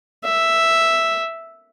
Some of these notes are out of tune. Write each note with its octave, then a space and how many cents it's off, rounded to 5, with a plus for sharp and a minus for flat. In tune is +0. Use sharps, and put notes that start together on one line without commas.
E5 +0